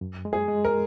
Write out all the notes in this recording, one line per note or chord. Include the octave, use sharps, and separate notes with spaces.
F#2
G#3
G#4
G#3
A#4